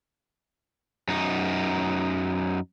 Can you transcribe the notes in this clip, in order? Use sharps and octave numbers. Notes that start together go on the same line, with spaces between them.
F#2 D#4